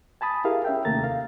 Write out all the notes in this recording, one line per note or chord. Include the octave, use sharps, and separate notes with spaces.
G#5 A5 B5 D#6
E4 G4 G#4 A#4 F5
C#4 E5 G5
D#2 C3 A3 A#3 A#5 A6
F5